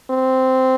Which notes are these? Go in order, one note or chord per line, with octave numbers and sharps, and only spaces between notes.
C4